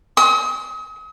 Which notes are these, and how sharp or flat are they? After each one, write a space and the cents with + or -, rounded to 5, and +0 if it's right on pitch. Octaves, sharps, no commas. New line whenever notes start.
D#6 +40